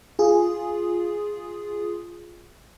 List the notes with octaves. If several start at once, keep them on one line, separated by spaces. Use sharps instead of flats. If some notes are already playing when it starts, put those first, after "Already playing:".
F4 G#4